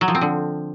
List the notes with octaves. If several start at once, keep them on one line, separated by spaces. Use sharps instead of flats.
F#3
F3
C4
D3